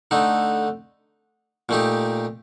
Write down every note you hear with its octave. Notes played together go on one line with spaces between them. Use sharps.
D3 A3 D#4
A#2 A3 D#4 G4